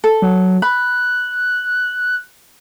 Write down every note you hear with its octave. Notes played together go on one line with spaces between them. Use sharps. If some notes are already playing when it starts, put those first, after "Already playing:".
A4
F#3
B5 F#6